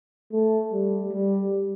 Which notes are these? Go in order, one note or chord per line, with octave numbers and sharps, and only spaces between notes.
A3
G3
G3